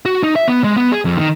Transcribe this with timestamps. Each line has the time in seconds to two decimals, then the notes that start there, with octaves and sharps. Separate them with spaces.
0.05 F#4
0.23 D#4
0.36 E5
0.48 B3
0.64 G#3
0.76 B3
0.92 G#4
1.05 F2
1.17 D#3